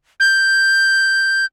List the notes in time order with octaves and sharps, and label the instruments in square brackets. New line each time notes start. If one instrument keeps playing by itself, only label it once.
[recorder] G6